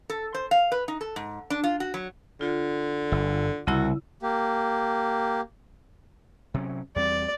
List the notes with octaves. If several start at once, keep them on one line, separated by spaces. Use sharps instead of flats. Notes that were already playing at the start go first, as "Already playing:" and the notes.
A4
C5
F5
B4
D#4
A4
G#2
D4
F4
F#4
F#3
D3 F4
G1
C2 C#3 E4 F#4 E6
A#3 G4
C3 F#3 C#4
E2 G3 C4 D5